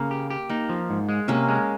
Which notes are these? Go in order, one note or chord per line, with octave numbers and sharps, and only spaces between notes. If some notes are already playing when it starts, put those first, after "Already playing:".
Already playing: C#3 A#3
G4
G4
A#3 D#4
F3
G#2
G#3
C3 A#3 C#4
G#3